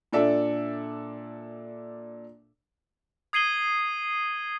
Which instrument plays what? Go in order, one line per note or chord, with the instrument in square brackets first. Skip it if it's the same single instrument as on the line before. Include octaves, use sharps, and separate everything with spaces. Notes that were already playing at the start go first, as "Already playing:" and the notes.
[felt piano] A#2 D4 A4 D5 E5
[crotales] D#6 G#6 C7 D#7 F#7 G7